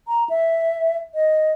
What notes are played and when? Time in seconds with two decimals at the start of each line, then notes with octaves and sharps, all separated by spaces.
0.08 A#5
0.30 E5
1.14 D#5